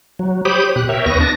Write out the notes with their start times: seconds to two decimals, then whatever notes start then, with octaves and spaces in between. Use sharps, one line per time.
0.19 F#3
0.45 G4 C5 C#5 B5 D6 D#6
0.76 B2 G4 F#6
0.89 A#4 C#5 E5 G5
1.06 D#2 B3 B4 C#6 A#6
1.20 D4 A5 A#6